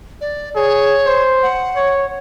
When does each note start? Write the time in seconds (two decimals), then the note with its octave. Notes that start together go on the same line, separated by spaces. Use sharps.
0.21 D5
0.55 G#4 C#5
1.06 C5
1.43 F#5
1.76 C#5